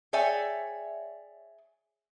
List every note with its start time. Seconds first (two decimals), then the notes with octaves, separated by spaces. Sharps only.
0.13 G#4 C#5 D5 E5 G5 G#5